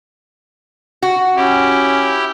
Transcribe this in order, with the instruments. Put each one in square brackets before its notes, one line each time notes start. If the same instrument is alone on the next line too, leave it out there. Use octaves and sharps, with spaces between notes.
[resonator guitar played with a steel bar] F#4
[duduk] C#4 [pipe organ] E4 G4